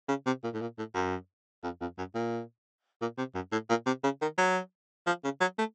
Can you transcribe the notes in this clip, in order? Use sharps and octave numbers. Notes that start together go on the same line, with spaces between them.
C#3
C3
A#2
A2
A#2
A2
F#2
F2
F2
F#2
A#2
A#2
C3
F#2
A2
A#2
C3
C#3
D#3
F#3
F3
C#3
F#3
A3